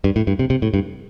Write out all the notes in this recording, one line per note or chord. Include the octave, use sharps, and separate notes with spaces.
G2
A2
G2
C3
C3
A2
G2